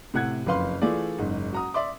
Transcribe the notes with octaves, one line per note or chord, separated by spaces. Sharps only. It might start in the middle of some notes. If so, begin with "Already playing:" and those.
A2 C3 F#5 F#6 G#6
F#1 F2 B4 F5 C6
E3 A3 F4 G#4 D5
F#1 G#2
F#4 A#5 D#6
D5 E5 C6 D6